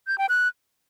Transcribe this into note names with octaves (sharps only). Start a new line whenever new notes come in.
G6
G5
F#6